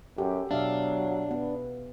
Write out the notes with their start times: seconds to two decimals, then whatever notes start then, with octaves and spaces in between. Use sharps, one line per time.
0.18 F#2 G4 A4
0.51 B2 F#3 D4 E5 F5
1.31 B3